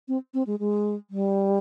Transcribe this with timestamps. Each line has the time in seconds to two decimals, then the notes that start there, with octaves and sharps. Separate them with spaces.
0.08 C4
0.34 C4
0.47 G#3
0.59 G#3
1.10 G3